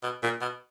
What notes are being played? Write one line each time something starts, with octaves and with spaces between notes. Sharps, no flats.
B2
A#2
B2